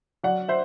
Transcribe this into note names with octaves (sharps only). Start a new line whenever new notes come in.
F#3 D5 F#5
C5 E5